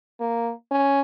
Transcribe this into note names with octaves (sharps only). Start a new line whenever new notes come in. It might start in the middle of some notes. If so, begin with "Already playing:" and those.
A#3
C#4